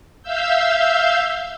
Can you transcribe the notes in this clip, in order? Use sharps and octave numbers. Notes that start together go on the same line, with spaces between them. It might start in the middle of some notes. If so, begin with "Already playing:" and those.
E5 F5 E6 G6